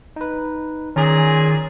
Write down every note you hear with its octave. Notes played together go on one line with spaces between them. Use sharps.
D#4 B4
A#2 D#3 C#4 G#4